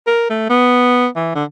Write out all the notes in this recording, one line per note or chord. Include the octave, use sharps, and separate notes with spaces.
A#4
A3
B3
E3
D3